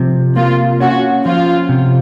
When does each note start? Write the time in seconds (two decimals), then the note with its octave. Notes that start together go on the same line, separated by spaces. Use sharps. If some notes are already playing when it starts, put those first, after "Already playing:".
Already playing: C3 F3
0.36 A#3 F4
0.80 C#4 F#4
1.25 F3 F4
1.69 C3